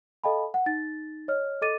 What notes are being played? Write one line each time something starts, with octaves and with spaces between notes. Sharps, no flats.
A4 D#5 F5 G5 A5 B5
F#5
D#4 A6
C#5 D#5 F6
A4 D#5 D6 A6 D#7